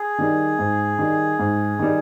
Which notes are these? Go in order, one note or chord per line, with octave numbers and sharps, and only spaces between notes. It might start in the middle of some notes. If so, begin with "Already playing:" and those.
Already playing: G#4
D#3 G3
G#2
D#3 G3
G#2
D#3 G3